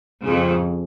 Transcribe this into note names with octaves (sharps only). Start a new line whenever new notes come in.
F2 C#3